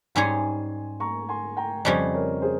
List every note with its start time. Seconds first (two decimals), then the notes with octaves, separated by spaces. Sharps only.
0.15 G#2 G3 C#4 G#4 C#5 G#5 C6
1.00 A#5 C#6
1.29 G#5 C6
1.57 G5 A#5
1.85 F2 C#3 G3 C#4 C5 D#5
2.14 A#4 C#5
2.42 G#4 C5